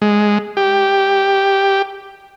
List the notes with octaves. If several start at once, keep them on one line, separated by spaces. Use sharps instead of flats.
G#3
G4